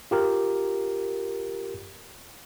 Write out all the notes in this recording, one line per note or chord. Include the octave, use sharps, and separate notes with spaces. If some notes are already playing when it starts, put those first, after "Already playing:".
F4 G4 A#4